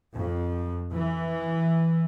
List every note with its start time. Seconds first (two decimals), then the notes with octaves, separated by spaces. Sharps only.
0.15 F2
0.92 E3